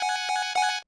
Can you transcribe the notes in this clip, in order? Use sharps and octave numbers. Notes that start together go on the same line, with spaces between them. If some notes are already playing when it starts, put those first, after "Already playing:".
Already playing: F#5 G#5
F#5 G#5